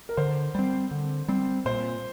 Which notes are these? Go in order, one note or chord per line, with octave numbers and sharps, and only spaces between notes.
A#4
D3 C5
G3 C4
D3
G3 C4
A#2 C5